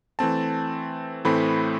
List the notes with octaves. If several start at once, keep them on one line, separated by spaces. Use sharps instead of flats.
E3 A3 C4 A5
A2 E3 A3 C4 B5